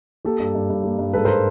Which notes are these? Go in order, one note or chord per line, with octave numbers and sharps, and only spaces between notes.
A#3 G4 A4
G2
G2
G2
A#3
G2
G#2 A4 B4
A#4 C5